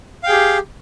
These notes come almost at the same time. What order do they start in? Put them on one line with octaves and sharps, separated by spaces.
F5 G5 G#4 G4